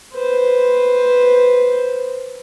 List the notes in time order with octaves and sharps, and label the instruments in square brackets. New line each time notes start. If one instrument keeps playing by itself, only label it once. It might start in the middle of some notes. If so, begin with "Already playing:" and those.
[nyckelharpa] B4 C5